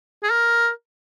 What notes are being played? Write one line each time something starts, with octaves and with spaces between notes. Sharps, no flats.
G#4
A#4